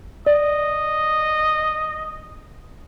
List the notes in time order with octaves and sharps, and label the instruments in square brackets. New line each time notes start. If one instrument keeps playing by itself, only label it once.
[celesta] D5 [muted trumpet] D#5